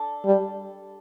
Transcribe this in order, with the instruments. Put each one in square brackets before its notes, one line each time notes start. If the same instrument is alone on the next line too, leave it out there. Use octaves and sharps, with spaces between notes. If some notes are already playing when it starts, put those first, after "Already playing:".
Already playing: [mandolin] D4 A4
[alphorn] G3